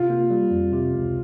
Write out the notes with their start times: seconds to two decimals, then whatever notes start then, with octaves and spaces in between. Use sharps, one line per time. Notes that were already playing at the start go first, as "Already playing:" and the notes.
Already playing: C3 F4
0.10 A#3
0.30 G3
0.51 F2
0.72 C3
0.94 C#2